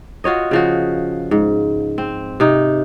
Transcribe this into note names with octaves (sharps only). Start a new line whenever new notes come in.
F4 F#4 C#5 D#5
C#3 F3 F#4
G#2
C4
C3 D#4